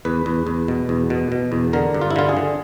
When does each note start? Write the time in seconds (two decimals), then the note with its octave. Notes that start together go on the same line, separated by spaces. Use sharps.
0.05 E2 B4
0.26 E2
0.47 E2
0.68 B2
0.89 E2
1.10 B2
1.32 B2
1.52 E2
1.73 D3 A#4
1.94 G2
2.01 F4
2.11 E4
2.16 D3 F4
2.29 G#4
2.37 D3